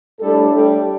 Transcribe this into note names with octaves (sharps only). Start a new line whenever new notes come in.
A2 G3 A3 D4 A4
G3 G4